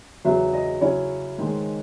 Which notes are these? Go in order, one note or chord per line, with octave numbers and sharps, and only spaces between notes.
E2 C#3 F#3 E5
D#5
C#3 F#3 C#4 E4 C#5
G#2 D#3 G#3